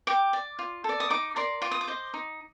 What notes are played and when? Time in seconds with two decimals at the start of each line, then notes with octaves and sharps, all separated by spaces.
0.07 G4 D6
0.33 D5
0.59 F4
0.84 A4 D5
1.00 D#6
1.10 D#4 D6
1.36 A#4 D5 C6
1.62 F4 D6
1.71 D#6
1.81 D6
1.88 C5 D#5
2.14 D#4